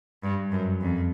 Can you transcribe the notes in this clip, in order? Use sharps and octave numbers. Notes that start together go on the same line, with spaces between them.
G2
F#2
F2